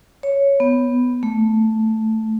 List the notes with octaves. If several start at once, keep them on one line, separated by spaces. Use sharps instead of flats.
C#5
B3
A3